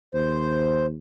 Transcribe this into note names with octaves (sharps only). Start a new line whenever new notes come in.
D#2 C5